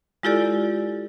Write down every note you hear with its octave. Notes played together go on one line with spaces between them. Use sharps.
G#3 E4 F4 G4 A4 D5